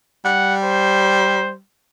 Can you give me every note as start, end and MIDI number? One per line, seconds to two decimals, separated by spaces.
0.25 1.59 55
0.25 0.55 78
0.64 1.53 72